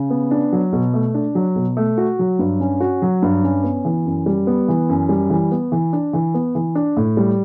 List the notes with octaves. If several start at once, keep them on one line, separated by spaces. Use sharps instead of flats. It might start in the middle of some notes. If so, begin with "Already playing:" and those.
Already playing: C#3
B3
D4
F#3
B2
A3
D4
F#3
B2
A3
F#4
F#3
G2
C#4
F#4
F#3
G2
C#4
B3
E3
F#2
G3
B3
E3
F#2
G3
E3
B3
E3
D4
E3
B3
E3
D4
A2
G3